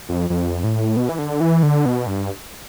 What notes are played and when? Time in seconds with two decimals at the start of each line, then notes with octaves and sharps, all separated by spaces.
0.09 F2
0.30 F2
0.64 A2
0.97 B2
1.09 E3
1.19 D3
1.40 E3
1.63 D3
1.86 B2
2.07 G2